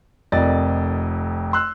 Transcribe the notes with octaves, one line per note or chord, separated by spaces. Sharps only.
F1 F2 A#4 D5 D#5 A6
C6 E6 F#6